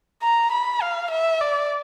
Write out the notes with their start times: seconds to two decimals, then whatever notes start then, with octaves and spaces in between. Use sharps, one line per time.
0.22 A#5
0.52 B5
0.82 F5
1.10 E5
1.41 D5